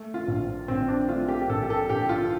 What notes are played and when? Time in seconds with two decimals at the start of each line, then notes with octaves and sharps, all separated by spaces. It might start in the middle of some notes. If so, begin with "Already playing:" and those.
Already playing: A3
0.14 F4
0.28 A#1
0.68 A#1 C4
0.88 D4
1.08 A3 F4
1.28 G4
1.42 G4
1.49 A#1 A4
1.63 G4
1.70 A4
1.90 A#1 G4
2.09 F4